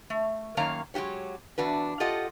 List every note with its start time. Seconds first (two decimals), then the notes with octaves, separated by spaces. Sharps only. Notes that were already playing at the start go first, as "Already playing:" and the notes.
0.10 A3
0.57 F#2 D#3 A#3 C#5 F5 A#5
0.94 F#3 G#3 F#4 G4 C#5
1.58 E2 D4 F#4 B4
2.00 F4 G4 A4 D#5 F#5